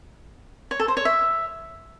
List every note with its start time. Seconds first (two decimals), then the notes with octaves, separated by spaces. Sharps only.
0.71 C#5
0.80 A4
0.88 C5
0.97 C#5
1.05 E5